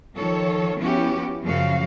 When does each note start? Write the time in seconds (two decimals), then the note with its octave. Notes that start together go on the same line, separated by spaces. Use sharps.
0.15 D#3 F3 A4 C#5
0.78 F3 B3 C#4 E4 F#4 G4
1.43 F#2 C#3 F3 F#4 F5